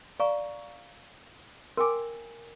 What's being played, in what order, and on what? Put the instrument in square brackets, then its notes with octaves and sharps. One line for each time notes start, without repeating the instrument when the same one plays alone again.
[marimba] D5 [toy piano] F5 A#5 C#6
[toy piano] A#4 G5 G#5 [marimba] C6 D6